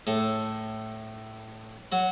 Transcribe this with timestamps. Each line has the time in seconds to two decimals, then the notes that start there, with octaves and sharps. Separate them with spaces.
0.07 A2 A3
1.92 F#3 F#4